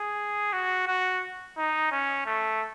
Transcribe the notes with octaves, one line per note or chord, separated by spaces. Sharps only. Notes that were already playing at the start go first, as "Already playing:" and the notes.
Already playing: G#4
F#4
F#4
D#4
C#4
A3